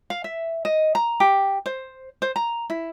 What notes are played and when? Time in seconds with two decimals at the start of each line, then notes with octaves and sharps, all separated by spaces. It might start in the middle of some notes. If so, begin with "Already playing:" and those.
0.10 F5
0.24 E5
0.65 D#5
0.95 A#5
1.20 G4
1.66 C5
2.22 C5
2.36 A#5
2.70 E4